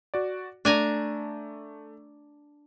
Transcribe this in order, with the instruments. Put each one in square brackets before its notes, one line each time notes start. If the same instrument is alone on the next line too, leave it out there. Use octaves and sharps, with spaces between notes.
[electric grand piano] F#4 D5
[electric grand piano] A3 [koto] D4 G#5 A#5